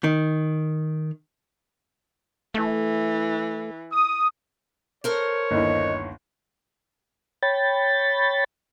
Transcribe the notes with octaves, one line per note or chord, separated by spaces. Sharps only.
D#3
E3 A3
D#6
A4 A#4 C5 C#5
G1 D#2 E4 D#5
C#5 G5 B5 A6